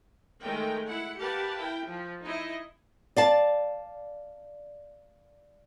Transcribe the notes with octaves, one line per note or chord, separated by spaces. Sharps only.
D#3 G#3 A3 A#4 G5
E4 F#5
G4 A#4 B4 F5 F#5 A5
E4 A#4 G5
F3
D#4 E4 D#5
D5 F5 A5